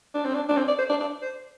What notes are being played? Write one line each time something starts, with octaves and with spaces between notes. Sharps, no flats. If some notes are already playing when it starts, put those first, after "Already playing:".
D4
C4
D4
D4
C4
D5
C5
D5
D5
C5